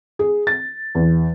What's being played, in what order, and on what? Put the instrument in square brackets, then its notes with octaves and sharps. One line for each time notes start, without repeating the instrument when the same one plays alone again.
[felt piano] G#4
A6
E2